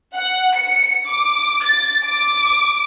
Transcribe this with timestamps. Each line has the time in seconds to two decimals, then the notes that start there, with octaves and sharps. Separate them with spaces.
0.15 F#5
0.56 C#7
1.08 D6
1.64 A6
2.04 D6